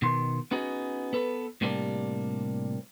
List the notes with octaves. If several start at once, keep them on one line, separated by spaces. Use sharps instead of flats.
B2 D#3 C6
B3 C#4 D#4 F#4 G#4
B3 A4 B4
A2 C3 G3 A#3 D4